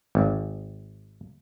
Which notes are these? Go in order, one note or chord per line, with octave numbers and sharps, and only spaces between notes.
G#1